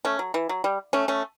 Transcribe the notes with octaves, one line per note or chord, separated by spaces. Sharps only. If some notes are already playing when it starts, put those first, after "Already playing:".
A3 C#4
F#3
E3
F#3
G3
A3 C#4
A3 C#4